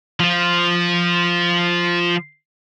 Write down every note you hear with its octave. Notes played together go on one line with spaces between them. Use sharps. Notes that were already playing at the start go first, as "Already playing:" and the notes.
F3 F4